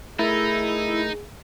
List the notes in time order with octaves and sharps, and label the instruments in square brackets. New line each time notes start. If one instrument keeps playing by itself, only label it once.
[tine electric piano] A3 A#4 A6 [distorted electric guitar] D#4 [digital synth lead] E4 [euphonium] G#4